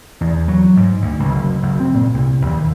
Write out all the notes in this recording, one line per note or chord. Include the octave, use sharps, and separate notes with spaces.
E2
F#3
G#2
D2
C#2
F#1
F#1
C4
A#2
C2
D#2